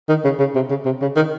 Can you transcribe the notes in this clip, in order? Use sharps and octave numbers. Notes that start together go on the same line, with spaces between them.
D#3
C#3
C#3
C3
C#3
C3
C#3
D#3